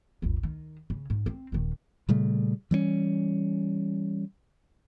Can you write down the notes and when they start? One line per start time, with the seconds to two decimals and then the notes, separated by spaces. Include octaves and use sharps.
0.22 G1 D2
0.43 D#3
0.90 C#3
1.10 G#2
1.26 C4
1.52 D#1 D#3
2.09 A#2 C#3 G3 A3
2.71 E3 G3 B3 C#4